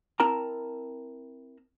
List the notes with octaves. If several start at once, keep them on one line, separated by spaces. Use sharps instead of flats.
C4 E4 A#4 A5 A#5